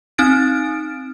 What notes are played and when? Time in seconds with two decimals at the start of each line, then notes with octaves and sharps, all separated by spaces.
0.18 C4 D#4 F6 A6 D7